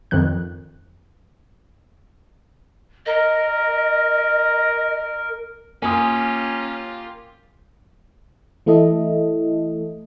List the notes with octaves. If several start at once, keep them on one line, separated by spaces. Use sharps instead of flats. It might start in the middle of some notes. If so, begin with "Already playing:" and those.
F2 D#3 F3 F#6
A#4 D#5
A#3 C#4 F4 G4 G#5 D#6
E3 A3 E4 A4 D#5